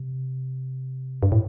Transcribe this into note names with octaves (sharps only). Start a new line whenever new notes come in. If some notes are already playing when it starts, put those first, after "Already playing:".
Already playing: C3
G2
A2